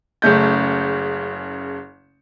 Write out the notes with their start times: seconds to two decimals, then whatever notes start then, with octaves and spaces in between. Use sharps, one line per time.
0.22 F#1 C#3 A3 G6